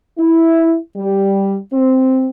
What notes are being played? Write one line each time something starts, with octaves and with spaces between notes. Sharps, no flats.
E4
G3
C4